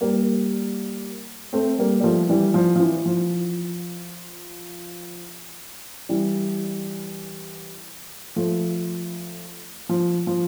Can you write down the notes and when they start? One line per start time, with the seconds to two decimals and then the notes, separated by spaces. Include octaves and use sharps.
0.01 G3 A#3
1.53 A3 C4
1.79 G3 A#3
2.00 G3
2.04 F3 A3
2.29 E3 G3
2.54 F3
2.76 F3
2.79 E3
3.06 F3
6.09 E3 G3
8.36 F3 A3
9.89 F3
10.27 F3